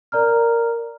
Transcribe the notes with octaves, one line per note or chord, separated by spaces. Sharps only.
A#4 D5 A#5 F6